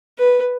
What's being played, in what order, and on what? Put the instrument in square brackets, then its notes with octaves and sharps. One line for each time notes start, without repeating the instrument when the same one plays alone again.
[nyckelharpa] B4